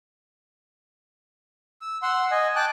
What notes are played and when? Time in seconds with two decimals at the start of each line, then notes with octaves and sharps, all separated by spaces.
1.82 E6
2.02 F#5 C6 E6
2.32 D#5 G#5
2.56 G5 A5 D6 F#6